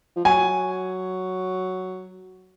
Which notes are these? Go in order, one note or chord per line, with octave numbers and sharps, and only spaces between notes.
F3
F#3 G#5